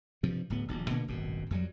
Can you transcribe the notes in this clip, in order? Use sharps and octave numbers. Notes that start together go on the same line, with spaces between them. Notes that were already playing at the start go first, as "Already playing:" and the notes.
G2 C3 F3
D1 A2 B3
D#1 A#1
A#2 D3 A#3 B3
D#1 G#1 F#2 B2
F2 F#3 G3